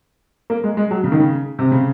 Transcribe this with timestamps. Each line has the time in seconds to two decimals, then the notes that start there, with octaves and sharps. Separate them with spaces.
0.50 A#3
0.64 G#3
0.77 G#3
0.91 F#3
1.04 C#3
1.12 D#3
1.20 C#3
1.59 C3
1.72 C#3